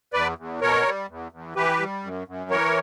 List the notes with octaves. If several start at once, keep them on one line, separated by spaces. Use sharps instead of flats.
E2 B4 D5
E2
B2 A#4 C#5
G3
E2
E2
E3 G4 B4
G3
F#2
F#2
E3 A#4 C#5